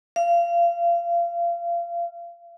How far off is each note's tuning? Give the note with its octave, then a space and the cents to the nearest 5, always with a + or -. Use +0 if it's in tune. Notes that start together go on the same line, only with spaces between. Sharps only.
F5 -25